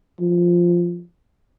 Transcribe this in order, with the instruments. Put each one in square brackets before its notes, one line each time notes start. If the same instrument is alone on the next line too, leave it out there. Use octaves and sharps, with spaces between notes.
[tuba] F3